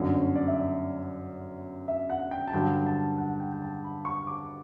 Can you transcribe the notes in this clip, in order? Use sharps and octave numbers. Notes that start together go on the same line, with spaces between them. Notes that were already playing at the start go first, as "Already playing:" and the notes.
Already playing: G1 F#2 D3
C#5
D5
E5
D5
E5
F#5
G5
A5
G2 D3 F#3 G5
A5
F#5
G5
G5
A5
B5
C#6
D6